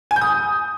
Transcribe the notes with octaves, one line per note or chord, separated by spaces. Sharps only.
G#5
G6
D#6